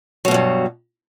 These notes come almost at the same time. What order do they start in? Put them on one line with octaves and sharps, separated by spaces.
F#3 B2 E2 G2